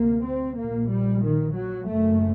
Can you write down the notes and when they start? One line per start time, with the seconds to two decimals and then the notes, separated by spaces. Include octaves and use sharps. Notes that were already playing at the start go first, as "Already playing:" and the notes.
Already playing: D2 C3 A#3
0.24 C4
0.57 A#1 A#2 A#3
0.90 G3
1.22 D#3
1.55 F#3
1.87 F#1 F#2 A3